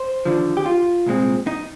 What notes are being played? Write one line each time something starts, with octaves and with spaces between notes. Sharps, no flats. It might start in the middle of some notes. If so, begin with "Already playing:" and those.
Already playing: C5
D#2 D3 F3
G4
F4
C2 A#2 G#3 C4
D#4